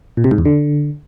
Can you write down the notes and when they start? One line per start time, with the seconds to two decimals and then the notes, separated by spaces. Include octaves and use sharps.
0.17 A#2
0.24 C3
0.31 G#2
0.38 E2
0.45 D3